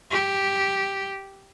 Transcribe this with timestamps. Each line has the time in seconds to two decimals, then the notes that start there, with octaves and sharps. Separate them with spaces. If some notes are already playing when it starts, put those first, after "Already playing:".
0.11 G4